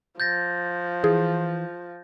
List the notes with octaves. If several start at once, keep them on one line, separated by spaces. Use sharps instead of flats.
F3 G6 A6 A#6
E3 G#4